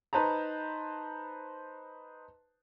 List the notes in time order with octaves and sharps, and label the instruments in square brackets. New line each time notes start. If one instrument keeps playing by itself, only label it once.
[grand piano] D#4 B4 C5 A5 A#5